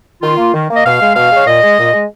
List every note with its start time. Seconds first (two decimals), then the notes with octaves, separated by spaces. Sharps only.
0.22 D#3 F4
0.38 A#3
0.54 D#3
0.69 A#3
0.75 D#5
0.85 B2 F5
1.01 G#3
1.16 B2 F5
1.31 G#3 C#5
1.47 A#2 D#5
1.63 G#3
1.79 A#2
1.94 G#3